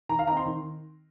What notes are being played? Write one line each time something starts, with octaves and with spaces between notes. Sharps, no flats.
D#3 A#5
F5
C4 D#4 A#5
C6
D#3